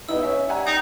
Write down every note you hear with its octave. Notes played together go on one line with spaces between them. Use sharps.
G2 B3 D#4 E4 E6
C#4 E5
G3 F#5 G#5 A#5
D#4 G5 D#6 G6